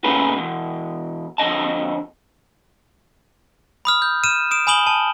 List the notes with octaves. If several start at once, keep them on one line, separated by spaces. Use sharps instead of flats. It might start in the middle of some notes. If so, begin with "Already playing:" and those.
A#2 C#3 A3 G#4 B4
E2 B2
F2 D3 D#5 A5
B5 D#6 F6
G6
F6 D#7 E7
D#6 D7 E7
G#5 B5 D#6 F#7 G7
A5